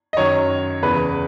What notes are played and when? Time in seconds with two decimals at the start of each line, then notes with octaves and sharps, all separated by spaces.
0.13 D#5
0.17 F#2 D#3 F#3 C#5
0.83 E2 C#3 E3 B4